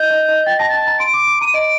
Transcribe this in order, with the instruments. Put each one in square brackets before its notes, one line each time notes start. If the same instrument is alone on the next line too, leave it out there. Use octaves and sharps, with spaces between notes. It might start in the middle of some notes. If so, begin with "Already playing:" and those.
Already playing: [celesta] D#5 [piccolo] G6
[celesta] D#5
D#5
[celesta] G5 [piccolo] A6
[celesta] A5 [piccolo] A#6
[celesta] A5 [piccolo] A6
[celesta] A#5
[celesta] C6 [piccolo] D7
[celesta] D6
D6
[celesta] A#5 [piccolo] D#7
[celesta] D#5 [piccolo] D7